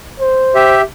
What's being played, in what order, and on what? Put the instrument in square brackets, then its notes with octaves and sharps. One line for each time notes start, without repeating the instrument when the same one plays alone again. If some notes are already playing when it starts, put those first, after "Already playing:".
[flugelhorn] C5
[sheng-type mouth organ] G4 E5